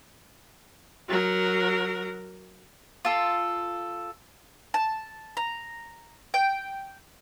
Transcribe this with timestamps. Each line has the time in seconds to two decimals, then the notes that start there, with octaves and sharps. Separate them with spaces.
1.09 F#3 A#4
3.05 F4 A4
4.74 A5
5.37 A#5
6.34 G5